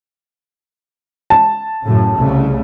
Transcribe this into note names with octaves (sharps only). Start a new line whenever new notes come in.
A5
F#2 A2 C#3
C2 C#3 A3